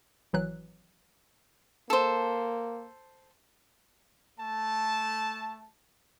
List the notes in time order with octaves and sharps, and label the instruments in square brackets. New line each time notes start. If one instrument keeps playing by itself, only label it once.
[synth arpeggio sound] G#1 E3 F#3 F#6
[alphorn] A#3 [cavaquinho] A4 C5
[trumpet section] A3 A5